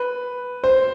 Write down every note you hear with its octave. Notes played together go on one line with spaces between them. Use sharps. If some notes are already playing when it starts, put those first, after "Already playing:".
Already playing: B4
C5